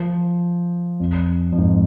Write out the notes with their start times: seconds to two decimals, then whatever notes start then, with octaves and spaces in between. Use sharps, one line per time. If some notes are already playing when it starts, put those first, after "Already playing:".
Already playing: F3
1.00 F2
1.52 F2
1.58 G#2